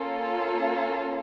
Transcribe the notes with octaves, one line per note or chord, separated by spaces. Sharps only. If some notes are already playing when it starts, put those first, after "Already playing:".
Already playing: A#3 C#4 F4 A4